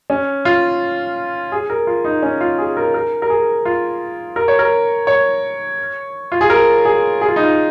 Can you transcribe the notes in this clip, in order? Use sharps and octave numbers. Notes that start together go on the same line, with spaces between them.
C#4
F4
G#4
A#4
F4
D#4
C#4
F4
G#4
A#4
A#4
A#4
G#4
F4
A#4
C#5
A#4
C#5
F4
G#4
A#4
G#4
G#4
F4
D#4
F4